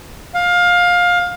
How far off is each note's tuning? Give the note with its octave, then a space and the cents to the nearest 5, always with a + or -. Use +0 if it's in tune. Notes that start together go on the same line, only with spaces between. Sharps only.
F5 +20